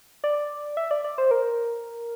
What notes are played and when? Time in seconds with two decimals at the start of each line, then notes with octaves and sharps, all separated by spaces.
0.24 D5
0.77 E5
0.91 D5
1.04 D5
1.18 C5
1.31 A#4